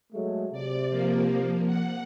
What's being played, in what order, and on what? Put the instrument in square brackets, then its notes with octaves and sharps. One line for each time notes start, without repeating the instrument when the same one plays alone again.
[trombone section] F#3 G#3 A3
[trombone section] C3 [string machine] D5
[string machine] F3 A#3
F#5